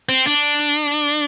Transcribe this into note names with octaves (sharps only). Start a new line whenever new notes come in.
C4
D4